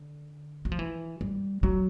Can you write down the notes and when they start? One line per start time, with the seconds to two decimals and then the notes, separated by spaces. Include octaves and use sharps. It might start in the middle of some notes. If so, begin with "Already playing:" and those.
Already playing: D3
0.65 F#3
0.72 F3
0.79 E3
1.21 G3
1.63 F#3